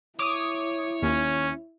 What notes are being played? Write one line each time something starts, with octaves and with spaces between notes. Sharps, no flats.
E4 C#5 D6 D#6
D#2 C#4